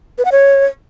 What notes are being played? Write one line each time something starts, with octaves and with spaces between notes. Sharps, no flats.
B4
F#5
C#5